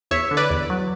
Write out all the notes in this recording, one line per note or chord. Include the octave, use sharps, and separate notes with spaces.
E2 C#5 E5
D3
B4 D5
E2
F#3